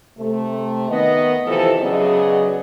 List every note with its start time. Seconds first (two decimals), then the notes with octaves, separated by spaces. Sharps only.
0.18 C3 A3
0.90 D#3 B3 D#5
1.47 C3 E3 F3 A4
1.81 C#3 F#3 B3 G#4 D5 D#5